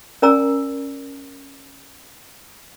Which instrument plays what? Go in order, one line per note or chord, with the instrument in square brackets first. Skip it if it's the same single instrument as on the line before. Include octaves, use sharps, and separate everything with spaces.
[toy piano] C#4 A#4 D5 G#5 A#5 E6